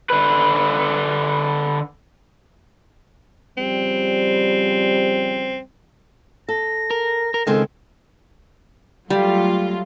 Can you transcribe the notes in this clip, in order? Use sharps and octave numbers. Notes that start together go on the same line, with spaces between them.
D3 B4
C#3 F3 G3 C4
A4 A#6
A#4
A#4
C#2 D#3 G#3 C4 A4
F#3 G3 A3 F4